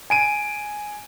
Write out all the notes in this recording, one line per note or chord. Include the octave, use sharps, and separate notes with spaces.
G#5 D7 D#7